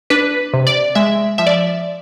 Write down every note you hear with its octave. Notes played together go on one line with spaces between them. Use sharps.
D4 B4
C3
D5
G#3 E5
F3 E5
D5